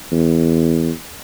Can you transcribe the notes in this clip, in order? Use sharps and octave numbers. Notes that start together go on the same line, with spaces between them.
E2